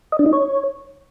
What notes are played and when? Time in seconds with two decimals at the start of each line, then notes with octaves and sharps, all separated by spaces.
0.12 D#5
0.19 D4
0.26 D#4
0.33 C#5